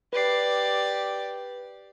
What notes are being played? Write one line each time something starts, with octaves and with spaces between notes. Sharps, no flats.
G4 B4 D5 C7